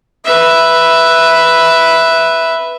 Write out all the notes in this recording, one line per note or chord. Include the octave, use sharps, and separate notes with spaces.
B4 E5